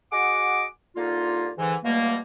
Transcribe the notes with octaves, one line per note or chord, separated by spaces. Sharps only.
F#4 G#4 D#5 F#5 D6
C2 D3 A#3 D#4 F4
G#2 D3 E3
C#2 B2 G3 A3 A#3